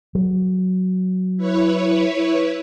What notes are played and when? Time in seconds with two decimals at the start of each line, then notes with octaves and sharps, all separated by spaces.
0.15 F#3
1.37 E4 B4 C#5